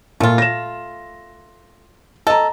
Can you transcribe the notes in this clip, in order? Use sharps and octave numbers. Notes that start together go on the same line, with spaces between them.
A#2 A3 F4
A#6 E7
A4 D#5 A#5